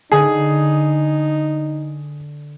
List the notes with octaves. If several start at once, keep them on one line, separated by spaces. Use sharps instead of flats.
D3 D#4 G#4